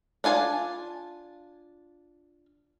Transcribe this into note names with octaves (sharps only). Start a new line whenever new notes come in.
D4 F4 G#5 A5